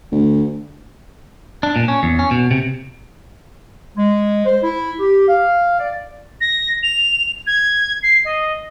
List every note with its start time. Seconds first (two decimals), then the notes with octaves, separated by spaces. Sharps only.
0.12 D2
1.63 D4
1.76 A#2
1.88 C#4
2.03 E2
2.19 C#4
2.31 B2
2.51 C3
3.96 G#3
4.45 C5
4.62 E4
4.99 G4
5.27 F5
5.79 D5
6.41 A#6
6.83 F7
7.47 G#6
8.03 C7
8.25 D#5